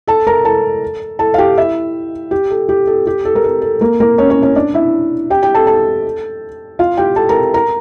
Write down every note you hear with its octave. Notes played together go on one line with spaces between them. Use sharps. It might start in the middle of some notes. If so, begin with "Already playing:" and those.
A4 A5
A#4 A#5
A4 A5
A4 A5
F5
G4 G5
E4 E5
G4
A4
G4
A4
G4
A4
A#4
A4
A4
A#3 A#4
A#3 A#4
C#4 C#5
C#4 C#5
C#4 C#5
D4 D5
E4 E5
G4 G5
G4 G5
A4 A5
A4 A5
F4 F5
G4 G5
A4 A5
A#4 A#5
A#4 A#5